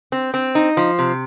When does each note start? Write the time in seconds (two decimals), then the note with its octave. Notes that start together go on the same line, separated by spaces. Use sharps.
0.12 C4
0.34 C4
0.55 D#4
0.77 F3
0.99 C3